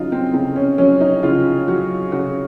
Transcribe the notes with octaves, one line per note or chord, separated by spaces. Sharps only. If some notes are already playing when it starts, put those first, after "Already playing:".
Already playing: C#3 F#3 D#4 F4
C4
C#3 C4
C#4
F#3 C#4
D#4
C#3 F4
F#3 F#4
C#3 F#4